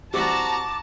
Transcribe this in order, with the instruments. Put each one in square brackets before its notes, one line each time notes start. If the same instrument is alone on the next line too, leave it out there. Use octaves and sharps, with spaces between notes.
[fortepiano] E3 G3 C4 [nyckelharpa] F#4 A#5 [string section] A5 [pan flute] D6